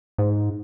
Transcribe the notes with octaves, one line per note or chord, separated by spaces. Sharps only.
G#2